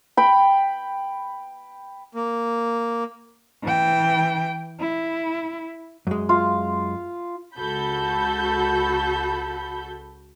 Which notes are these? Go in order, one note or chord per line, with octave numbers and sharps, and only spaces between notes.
G5 B5
A#3
E3 G5
E4
F#2 G#3
F4
C#2 F#4 A4 B5 G6